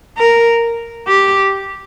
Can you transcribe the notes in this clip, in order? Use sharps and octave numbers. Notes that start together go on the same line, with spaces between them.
A#4
G4